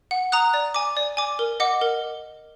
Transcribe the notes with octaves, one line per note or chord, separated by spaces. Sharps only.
F#5
A#5 D#6 F#6
D5
G#5 D6
D5
G#5 D6
A#4
D#5 F#5 D6
A#4